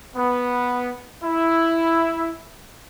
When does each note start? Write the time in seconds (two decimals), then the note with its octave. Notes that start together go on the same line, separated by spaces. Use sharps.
0.14 B3
1.22 E4